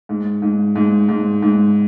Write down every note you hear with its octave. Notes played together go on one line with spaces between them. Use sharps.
G#2
G#2
G#2
G#2
G#2